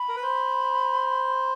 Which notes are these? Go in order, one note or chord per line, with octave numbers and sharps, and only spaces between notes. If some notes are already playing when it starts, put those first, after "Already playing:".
Already playing: B5
A#4
B4
C5